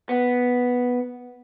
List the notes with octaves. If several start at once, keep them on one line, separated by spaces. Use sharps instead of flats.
B3